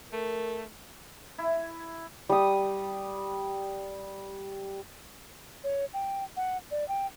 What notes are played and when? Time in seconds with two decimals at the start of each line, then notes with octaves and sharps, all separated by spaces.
0.12 A3 A#4
1.38 E4
2.29 G3 D#6
5.64 C#5
5.94 G5
6.37 F#5
6.71 D5
6.88 G5